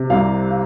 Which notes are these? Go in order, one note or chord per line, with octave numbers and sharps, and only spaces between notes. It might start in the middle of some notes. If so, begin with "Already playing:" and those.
Already playing: C3
C2 F5
F5